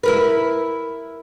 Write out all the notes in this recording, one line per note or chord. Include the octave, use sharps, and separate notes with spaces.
E4 A#4 B4